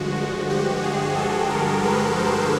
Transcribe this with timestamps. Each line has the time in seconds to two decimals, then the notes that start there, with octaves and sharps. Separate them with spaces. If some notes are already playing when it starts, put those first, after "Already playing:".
Already playing: G2 D3 F3 G#3 F#4
0.16 F#4
0.49 G4
0.83 G#4
1.15 A4
1.49 A#4
1.83 B4
2.16 C5